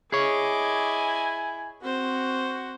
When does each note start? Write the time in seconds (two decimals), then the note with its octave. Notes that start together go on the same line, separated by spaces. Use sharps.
0.12 E4 G#4 C#5 D#5 G#5 D6
1.82 C4 F#4 C5